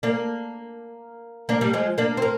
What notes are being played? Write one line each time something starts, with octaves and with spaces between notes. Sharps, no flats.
A#3 D4
A#3 D4
G3 A#3
F3 G#3
A#3 D4
C4
A#3